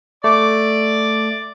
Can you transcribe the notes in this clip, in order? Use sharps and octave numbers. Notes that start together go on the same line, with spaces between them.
A3 D5 D6